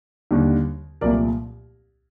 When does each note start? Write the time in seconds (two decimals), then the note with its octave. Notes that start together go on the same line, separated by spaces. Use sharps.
0.31 D#2 D3 G3
1.01 C2 A#2 F3 A3 A#4 D5